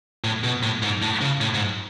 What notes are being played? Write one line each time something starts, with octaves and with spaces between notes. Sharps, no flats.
A2
B2
A2
G#2
A2
C#3
A2
G#2